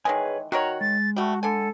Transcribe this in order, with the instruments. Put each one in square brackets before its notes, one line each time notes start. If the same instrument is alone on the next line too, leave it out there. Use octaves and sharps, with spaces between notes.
[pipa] D#3 E3 G#3 [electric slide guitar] G#4 B4 G#5 [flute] C#5
[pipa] D#3 A#4 C#5 [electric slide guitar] F#4 F#5 [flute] A#5
[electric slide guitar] G#3 [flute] A6
[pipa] G3 A3 [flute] F#4
[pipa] D3 G#5 [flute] A4